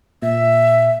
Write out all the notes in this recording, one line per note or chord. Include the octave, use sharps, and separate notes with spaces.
A#2 E5